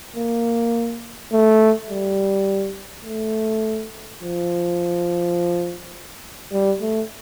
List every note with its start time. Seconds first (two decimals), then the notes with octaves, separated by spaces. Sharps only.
0.16 A#3
1.32 A3
1.90 G3
3.05 A3
4.21 F3
6.52 G3
6.81 A3